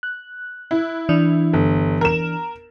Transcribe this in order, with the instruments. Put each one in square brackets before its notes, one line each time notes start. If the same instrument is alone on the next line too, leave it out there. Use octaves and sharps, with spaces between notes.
[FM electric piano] F#6
[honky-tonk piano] E4
[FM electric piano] E3 D4
[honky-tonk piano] G1
A#4 E7